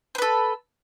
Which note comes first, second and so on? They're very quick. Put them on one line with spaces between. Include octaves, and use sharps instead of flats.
C5 B4 A4